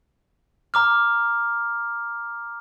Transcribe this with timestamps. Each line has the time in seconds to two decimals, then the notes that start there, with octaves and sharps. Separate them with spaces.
0.74 A#5 D6 F6